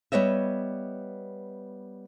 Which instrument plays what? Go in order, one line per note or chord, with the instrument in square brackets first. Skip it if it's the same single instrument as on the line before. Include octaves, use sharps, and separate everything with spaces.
[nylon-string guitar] G3 B3 C#5 D#5 E5